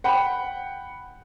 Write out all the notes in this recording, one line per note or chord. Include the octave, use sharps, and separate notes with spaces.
F#5 G5 B5